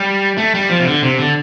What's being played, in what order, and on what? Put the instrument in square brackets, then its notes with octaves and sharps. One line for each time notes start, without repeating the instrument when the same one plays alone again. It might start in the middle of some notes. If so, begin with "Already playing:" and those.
Already playing: [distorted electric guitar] G3
A3
G3
F3
C3
D3
C3
D3